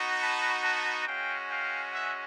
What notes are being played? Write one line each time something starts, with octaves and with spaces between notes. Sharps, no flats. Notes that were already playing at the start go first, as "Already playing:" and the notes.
Already playing: B3 D#4 F#4
A5 B5
A5 B5
G#3 C#4 F#4 F5 G5
F5 G5
E5 F#5